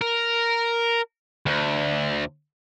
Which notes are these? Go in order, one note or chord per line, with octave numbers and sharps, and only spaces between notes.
A#4
D2